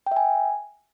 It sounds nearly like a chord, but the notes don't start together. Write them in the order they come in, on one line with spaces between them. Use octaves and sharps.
G5 E5 G#5